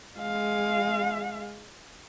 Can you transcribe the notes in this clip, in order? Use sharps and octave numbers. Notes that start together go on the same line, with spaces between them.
G#3 F5